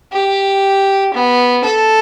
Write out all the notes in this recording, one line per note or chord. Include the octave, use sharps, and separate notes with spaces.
G4
B3
A4